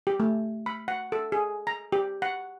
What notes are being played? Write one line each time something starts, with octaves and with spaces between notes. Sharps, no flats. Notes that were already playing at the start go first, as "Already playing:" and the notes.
G4
A3
B5
F#5
A4
G#4
A#5
G4
F#5